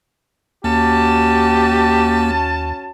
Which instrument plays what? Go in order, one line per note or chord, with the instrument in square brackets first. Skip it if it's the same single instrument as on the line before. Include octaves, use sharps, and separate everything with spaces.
[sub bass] D#2 [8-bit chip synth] A#3 [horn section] C#4 F#4 A5 [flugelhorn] G4